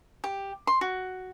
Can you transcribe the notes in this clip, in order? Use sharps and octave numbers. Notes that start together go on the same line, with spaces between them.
G4
C6
F#4